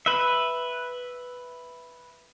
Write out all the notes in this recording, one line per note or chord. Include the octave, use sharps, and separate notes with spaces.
B4 E5